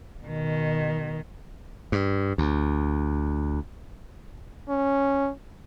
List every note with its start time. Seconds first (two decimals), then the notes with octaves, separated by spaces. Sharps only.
0.23 B2 D#3
1.92 G2
2.38 D2
4.69 C#4